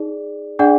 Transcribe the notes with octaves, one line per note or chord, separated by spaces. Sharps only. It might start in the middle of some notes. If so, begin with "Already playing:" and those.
Already playing: D#4 G#4 D5
D4 G#4 D5 F#5